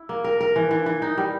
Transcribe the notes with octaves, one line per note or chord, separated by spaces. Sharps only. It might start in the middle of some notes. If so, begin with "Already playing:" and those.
Already playing: E4
A#3
A#4
A#4
E3
E3
E3
D#4
G3